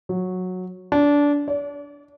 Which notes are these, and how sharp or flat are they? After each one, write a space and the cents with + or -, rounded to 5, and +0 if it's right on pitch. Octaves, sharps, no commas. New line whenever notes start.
F#3 -10
D4 -20
D5 -40